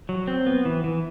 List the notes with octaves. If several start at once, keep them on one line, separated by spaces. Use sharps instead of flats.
F#3
C4
B3
E3
E3